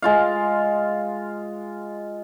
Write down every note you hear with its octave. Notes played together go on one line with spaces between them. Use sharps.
G#3 F4 F5